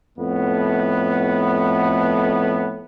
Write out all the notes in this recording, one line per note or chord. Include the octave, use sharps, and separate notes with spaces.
F2 A2 A3 B3